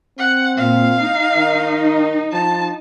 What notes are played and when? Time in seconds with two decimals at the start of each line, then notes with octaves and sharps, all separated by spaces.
0.19 C4 F#5
0.57 A#2 F5
0.99 D#4
1.36 D#3
2.33 F3 A5